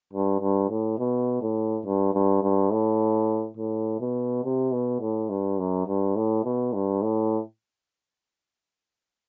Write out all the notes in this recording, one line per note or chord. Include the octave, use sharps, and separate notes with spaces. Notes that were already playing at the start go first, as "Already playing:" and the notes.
G2
G2
A2
B2
A2
G2
G2
G2
A2
A2
B2
C3
B2
A2
G2
F#2
G2
A2
B2
G2
A2